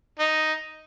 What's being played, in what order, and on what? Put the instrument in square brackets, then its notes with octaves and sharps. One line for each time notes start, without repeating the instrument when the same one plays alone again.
[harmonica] D#4